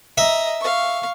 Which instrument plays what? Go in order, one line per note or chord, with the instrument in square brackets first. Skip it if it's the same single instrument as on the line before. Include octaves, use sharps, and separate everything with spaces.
[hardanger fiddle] D#5 A#5 [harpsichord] E5
[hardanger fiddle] F5 C#6